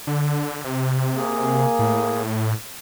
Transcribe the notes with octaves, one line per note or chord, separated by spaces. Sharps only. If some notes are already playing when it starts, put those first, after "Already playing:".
D3
C3
A#3 G#4
A2